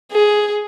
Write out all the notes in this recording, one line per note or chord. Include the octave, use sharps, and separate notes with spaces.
G#4